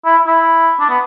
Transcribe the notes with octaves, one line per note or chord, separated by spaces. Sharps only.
E4
E4
D4
B3